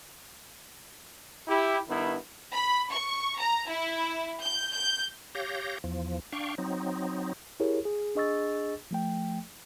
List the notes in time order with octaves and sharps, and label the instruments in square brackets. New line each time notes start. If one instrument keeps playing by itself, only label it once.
[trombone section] E4 G4
G2 D#3 B3 E4
[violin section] B5
C#6
A#5
E4
G6
G6
[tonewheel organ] G4 C#5 F5 G6 A#6
E2 F3
D4 F5 G5 C#6
F#3 C4 D#4
[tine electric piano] E4 G4 G#4 A#4 C#5
G#4
D4 G#4 D#5 C#6 E6 A6
F3 A3 G5